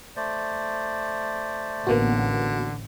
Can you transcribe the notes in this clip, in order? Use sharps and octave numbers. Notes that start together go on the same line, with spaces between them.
A3 C5 D5
A1 D3 A#3 B3 F#4